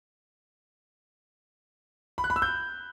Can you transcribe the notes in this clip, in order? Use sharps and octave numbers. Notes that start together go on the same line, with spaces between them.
B5
F#6
B5
E6
G6